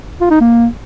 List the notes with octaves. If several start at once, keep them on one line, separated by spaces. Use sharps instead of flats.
F4
D#4
A#3